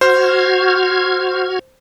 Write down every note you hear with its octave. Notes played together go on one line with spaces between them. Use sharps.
F#4 C5 F6 G#6